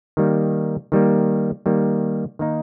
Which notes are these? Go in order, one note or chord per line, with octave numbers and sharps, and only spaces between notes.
D#3 G3 A#3
D#3 G3 A#3
D#3 G3 A#3
D#3 A#3 D#4